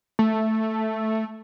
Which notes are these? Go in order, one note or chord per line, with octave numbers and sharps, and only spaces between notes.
A3